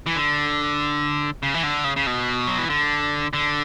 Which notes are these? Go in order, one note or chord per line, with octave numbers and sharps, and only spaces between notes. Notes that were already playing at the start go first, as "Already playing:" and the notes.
E3
D3
C#3
E3
D3
C#3
C#3
B2
F#3
E3
D3
D3